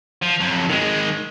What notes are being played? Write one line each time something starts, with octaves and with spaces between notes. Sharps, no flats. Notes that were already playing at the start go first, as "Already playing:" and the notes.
F3
F2 F#3
D#3 G#3